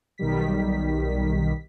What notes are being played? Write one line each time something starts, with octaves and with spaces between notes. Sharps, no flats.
B1 D#3 G3 B6